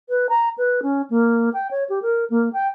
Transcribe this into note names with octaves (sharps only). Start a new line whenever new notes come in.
B4
A#5
B4
C#4
A#3
G5
C#5
G4
A#4
A#3
G5